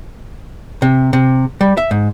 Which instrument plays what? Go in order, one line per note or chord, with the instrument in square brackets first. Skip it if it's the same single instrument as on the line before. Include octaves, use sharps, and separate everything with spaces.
[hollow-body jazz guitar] C3
C3
G3
E5
G#2